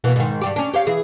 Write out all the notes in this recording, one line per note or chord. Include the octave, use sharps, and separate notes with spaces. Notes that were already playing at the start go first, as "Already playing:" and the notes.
B2 E3 A#3
G#2 D#3
G2 G3 G4
C#4 D4
G4 C#5 F5
E3 G#4